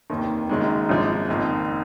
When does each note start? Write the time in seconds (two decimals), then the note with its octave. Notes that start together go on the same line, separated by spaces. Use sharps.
0.10 F1 D#2 D#3
0.49 F#1 F#2 D#3 G#3
0.89 G#1 F#2 F3 G#3
1.29 F#1 F2 D#3